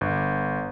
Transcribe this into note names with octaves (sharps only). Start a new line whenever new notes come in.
G1